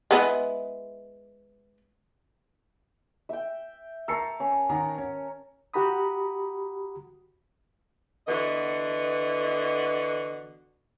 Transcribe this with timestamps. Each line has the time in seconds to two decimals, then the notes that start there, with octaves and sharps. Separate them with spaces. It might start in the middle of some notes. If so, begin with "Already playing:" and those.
0.11 G#3 B3 E4
3.29 E5 G5
4.08 A#4 A5 C#6 E6 C7 C#7
4.40 C#4
4.70 D#3 F#4 A#5
4.98 C#4
5.74 F#4 G4 A#5 B5 D#6
8.28 D3 E3 B3 F#4 D#5